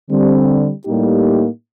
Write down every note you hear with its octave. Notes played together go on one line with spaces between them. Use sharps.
D3 G3 C4
A2 G3 A#3 D#4 G4